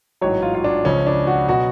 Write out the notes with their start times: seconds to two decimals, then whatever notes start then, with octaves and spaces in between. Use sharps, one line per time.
0.21 A1 G#2 F#3 C#5
0.42 F4
0.54 F4
0.64 D4
0.85 C#2 C#3 F3 C#4
1.07 D4
1.27 F#4
1.48 B2 F#3 F#4